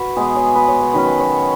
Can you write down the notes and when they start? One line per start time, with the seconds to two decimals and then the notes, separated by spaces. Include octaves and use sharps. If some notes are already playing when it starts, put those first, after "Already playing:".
Already playing: F#4 B4
0.16 B2 G#3 B3 G#4
0.36 C#5
0.55 B4
0.68 C#5
0.81 C#5
0.93 D#3 F#3 C#4 B4
1.07 B4
1.20 C#5